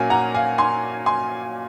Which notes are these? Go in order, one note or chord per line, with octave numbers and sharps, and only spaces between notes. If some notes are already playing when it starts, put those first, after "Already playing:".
Already playing: A#2 F#3 A#3 C#4 F5 G#5
F#5 A#5
F5 G#5
G#5 C6
G#5 C6